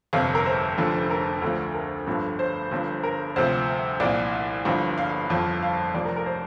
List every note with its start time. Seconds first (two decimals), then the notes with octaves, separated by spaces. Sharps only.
0.13 G1 F2 C3 F5
0.35 A#4
0.46 C5
0.78 F1 F2 D3 F3
1.10 A#4
1.42 D2 D3 F3
1.74 A#4
2.07 G1 G2 D3 F3
2.39 C5
2.71 G1 G2 F3
3.03 A#4
3.36 D2 C3 F3 C5
4.00 C2 A#2 F3 D5
4.65 G1 G2 F3
4.98 F5
5.30 G1 F2 F3
5.62 F5
5.94 F1 F2 F3 D5
6.05 A#4
6.16 A#4
6.26 C5